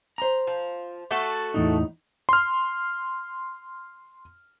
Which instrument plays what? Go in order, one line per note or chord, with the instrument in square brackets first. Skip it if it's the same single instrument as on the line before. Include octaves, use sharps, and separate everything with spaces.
[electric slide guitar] C5 A#5
[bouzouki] F3
A3 F#4 A4
[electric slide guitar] E2 A2 D#4
[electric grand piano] C6 F6